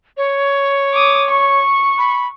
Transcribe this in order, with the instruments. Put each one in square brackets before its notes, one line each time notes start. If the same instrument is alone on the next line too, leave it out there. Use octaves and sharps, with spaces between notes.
[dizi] C#5
[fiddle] D6 D#6
C#6
[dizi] B5